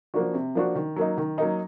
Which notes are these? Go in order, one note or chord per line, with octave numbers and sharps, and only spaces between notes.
F3 A#3 D4 F#4
C3
F3 A#3 D4 F#4
D#3
F#3 A#3 D#4
D#3
F#3 A#3 D#4